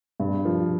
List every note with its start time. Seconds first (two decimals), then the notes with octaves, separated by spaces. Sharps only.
0.20 G2
0.45 F3